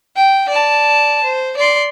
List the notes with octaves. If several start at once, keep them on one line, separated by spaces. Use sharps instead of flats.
G5
D5 A5
C5
D5 C6